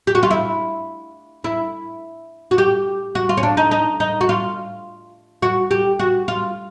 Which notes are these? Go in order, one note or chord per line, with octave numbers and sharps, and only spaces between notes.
G4
F#4
F4
E4
E4
F#4
G4
F#4
F4
C#4
D4
D#4
D#4
D#4
F#4
F4
F#4
G4
F#4
F4